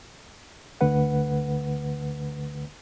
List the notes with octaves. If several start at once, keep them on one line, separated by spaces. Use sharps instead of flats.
D2 D3 A3 B4 F#5